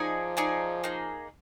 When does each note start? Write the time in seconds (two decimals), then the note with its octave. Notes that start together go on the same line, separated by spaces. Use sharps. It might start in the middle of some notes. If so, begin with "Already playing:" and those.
Already playing: F3 D#4 G#4 D5 G#5
0.37 D#4 G#4 D5 G#5
0.84 A#3 D#4 G#4